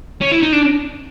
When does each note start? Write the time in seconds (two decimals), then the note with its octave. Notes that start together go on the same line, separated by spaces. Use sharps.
0.21 C#4
0.31 E4
0.42 D#4
0.52 D4